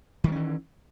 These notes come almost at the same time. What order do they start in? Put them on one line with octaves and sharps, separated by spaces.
D#3 G3 C#4 E3